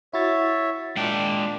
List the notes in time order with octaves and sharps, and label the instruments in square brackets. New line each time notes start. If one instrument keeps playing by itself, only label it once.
[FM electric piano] E4 F#4 A6 [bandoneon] C#5 E5
[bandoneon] A#2 D4 [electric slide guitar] G#3 G5